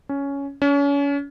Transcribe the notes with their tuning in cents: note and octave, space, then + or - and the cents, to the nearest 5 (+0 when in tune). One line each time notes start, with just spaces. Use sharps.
C#4 +10
C#4 +35